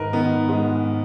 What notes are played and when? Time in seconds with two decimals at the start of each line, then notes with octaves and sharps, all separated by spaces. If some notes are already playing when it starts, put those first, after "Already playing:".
Already playing: G#2 D#3 A#4 B4
0.13 D#3 B3
0.49 G#2